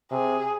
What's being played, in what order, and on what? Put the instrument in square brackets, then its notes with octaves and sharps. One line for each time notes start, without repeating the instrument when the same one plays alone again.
[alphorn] C3 [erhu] G#4